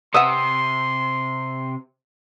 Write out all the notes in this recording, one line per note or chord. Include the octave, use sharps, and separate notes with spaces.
C3 B4 E5 F#5 C6 D#6 E6